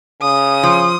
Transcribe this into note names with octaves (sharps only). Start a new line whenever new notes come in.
C#3 D#6
F3